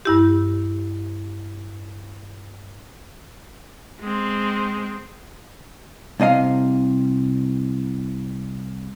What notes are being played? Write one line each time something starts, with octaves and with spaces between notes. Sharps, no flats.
G2 E4 G4
G#3 C4
C2 C3 D#5 F5